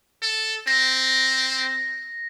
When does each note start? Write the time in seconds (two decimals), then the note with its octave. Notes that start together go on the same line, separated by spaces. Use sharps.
0.22 A4
0.67 C4 A#6